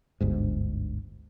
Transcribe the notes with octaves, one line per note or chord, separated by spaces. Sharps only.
G1 D2 G#2